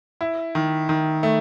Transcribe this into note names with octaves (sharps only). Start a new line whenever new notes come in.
E4
D#3
D#3
A3